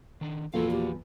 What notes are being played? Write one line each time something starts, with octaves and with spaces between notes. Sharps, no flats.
D#3 D4
E2 A#2 F3 F#4 A4 D5 F5
G4